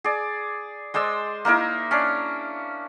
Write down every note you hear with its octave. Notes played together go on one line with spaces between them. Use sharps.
G#4 D5
G#3 C5 D5 E6
A#3 D#4 E4 A#4
C#4 D4